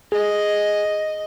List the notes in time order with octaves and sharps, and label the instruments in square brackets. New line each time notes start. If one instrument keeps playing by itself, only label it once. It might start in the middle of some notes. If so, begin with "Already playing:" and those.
[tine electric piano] G#4 [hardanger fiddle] D#5